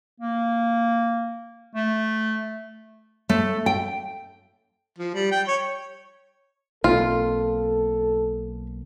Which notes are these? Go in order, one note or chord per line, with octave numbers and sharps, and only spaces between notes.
A#3
A3
A3
G5
F3
G3
G5
C#5
B1 A#3 C4 F4 A4